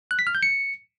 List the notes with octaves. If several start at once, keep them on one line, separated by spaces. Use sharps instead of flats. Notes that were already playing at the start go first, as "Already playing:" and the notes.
F#6
B6
F6
G6
C#7